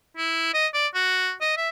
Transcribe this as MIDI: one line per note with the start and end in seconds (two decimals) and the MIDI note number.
0.17 0.52 64
0.54 0.67 75
0.74 0.87 74
0.94 1.32 66
1.41 1.54 75
1.57 1.69 76